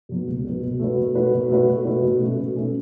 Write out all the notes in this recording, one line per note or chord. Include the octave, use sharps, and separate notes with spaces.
B2 F#3 B3
C#2
B2 F#3 B3
B2
A3 F#4 B4
B2
A3 F#4 B4
B2
A3 F#4 B4
B2
A3 F#4 B4
B2
A3 C#4
B2
A3 C#4